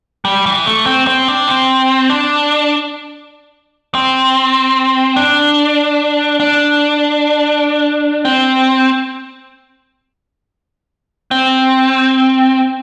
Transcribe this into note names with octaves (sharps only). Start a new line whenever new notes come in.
G3
E3
A3
C4
C4
D4
C4
D4
C4
D4
D4
C4
C4